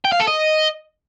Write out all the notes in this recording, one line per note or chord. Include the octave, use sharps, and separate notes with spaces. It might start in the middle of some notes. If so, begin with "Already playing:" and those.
G5
F5
A4
D#5